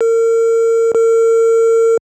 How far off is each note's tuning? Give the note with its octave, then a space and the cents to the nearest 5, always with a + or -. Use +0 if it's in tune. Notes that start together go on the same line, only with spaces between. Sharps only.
A#4 -35
A#4 -40